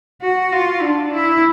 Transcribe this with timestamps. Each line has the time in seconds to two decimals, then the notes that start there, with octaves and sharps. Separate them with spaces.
0.22 F#4
0.52 F4
0.82 D4
1.13 E4